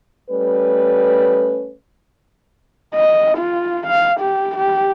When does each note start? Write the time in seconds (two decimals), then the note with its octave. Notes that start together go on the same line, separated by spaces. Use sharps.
0.30 G3 A3 C#4 B4
2.95 D#5
3.38 F4
3.87 F5
4.20 G4
4.57 G4